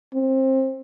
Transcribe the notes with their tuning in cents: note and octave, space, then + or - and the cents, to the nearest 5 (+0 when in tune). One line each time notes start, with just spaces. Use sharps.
C4 +20